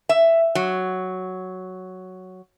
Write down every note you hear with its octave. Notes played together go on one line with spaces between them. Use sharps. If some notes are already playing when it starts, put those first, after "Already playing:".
E5
F#3